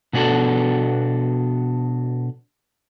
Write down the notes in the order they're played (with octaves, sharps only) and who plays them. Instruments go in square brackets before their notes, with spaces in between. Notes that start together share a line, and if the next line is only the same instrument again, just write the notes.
[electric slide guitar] B2 B3 D4 F#4 A4